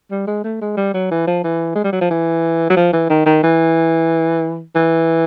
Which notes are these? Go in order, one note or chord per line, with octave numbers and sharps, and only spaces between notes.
G3
G#3
A3
G#3
G3
F#3
E3
F3
E3
G#3
G3
F#3
F3
E3
F#3
F3
E3
D#3
D#3
E3
E3